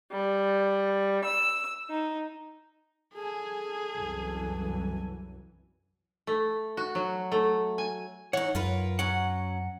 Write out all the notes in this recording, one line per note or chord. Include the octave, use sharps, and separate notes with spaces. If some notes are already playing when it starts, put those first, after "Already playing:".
G3
E6
D#4
G#4 A4 G#5
C2 F#2 E3
A3
F#4
F#3
A3
G#5
E3 D#4 C#5 F#5
F#2 F4 A#4 B4
F#3 C#4 F#5